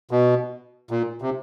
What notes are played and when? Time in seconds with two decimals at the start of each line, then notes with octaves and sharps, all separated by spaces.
0.11 B2
0.91 A#2
1.22 C3